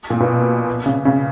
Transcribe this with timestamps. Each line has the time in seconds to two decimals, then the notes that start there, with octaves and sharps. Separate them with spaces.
0.10 A#2
0.20 B2
0.86 C#3
1.05 C#3